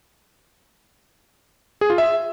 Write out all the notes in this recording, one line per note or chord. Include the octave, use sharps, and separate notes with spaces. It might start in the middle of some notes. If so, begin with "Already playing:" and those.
G#4
F4
E5